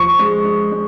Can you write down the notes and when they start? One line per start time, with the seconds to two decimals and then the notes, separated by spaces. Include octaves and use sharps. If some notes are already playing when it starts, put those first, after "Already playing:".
Already playing: F3 C#6
0.19 G#3
0.45 G#3
0.72 G#3